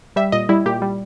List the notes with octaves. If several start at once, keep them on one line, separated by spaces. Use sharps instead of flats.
G3 E5
A#2 D#5
G3 E4
A#2 G4
G3